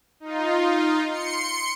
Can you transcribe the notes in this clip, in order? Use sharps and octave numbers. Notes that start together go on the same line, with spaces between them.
D#4 F4
C6 C#7